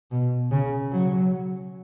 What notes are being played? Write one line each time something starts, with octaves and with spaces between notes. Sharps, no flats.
B2
C#3
F#3